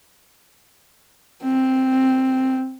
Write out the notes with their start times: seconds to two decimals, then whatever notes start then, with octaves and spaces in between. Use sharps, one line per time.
1.43 C4